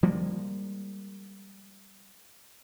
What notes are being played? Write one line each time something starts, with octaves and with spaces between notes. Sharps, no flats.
F3 G3 G#3 A#3